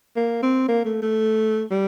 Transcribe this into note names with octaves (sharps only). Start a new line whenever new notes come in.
A#3
C4
A#3
A3
A3
G3